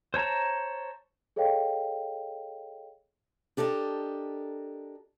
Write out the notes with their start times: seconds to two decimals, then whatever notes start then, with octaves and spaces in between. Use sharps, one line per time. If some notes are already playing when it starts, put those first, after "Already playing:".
0.14 C5 C#5 A5 A#5
1.36 G#4 A4 C#5 D#5 F5 G5
3.57 D4 G4 A4 A#4 D#5